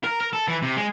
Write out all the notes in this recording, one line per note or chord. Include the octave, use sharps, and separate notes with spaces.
A#4
A#4
A4
E3
C3
G#3